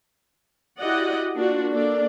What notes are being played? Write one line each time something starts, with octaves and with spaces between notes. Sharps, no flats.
E4 F#4 G4 D5 D#5 F#5
A#3 D4 F4 F#4
A#3 D4 A4 A#4 D5